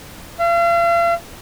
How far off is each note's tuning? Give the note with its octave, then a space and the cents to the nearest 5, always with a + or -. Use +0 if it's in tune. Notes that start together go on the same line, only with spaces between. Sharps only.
F5 -40